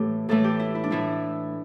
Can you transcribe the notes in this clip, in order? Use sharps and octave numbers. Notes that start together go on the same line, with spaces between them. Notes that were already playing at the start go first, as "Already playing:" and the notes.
Already playing: A2 E3 A3 G4 A4
A2 E3 A3 A4
G4
E4
E4
D4
A2 E3 A3 E4